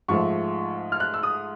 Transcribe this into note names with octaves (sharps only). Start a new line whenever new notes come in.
G#2 F3 A3 C#6
F6
F#6
E6
D#6